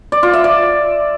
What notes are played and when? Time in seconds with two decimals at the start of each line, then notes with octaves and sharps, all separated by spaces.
0.12 D5
0.23 F4
0.33 E5
0.44 D5